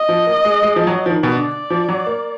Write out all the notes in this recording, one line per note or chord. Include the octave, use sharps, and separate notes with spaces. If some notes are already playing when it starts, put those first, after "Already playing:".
Already playing: D#5
F3
A#3
G#3
G#3
F3
F#3
F3
D#3
B2
D3 D5
F3
F#3
A#3